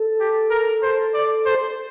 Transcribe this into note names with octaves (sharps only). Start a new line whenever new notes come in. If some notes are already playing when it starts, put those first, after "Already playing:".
Already playing: A4
G4
A#4
C5
D5
C5